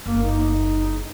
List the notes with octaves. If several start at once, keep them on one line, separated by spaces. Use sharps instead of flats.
F#1 A#3
D#4